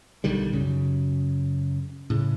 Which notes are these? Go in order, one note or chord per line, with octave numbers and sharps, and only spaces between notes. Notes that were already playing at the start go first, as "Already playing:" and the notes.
B1 D3 D#3 G3
F#2 C#3
A2 C#3